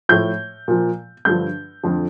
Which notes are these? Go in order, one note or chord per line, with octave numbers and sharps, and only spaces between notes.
A2 F3 G6
A#2 F3
G2 D3 F3 G6
F2 D3 F3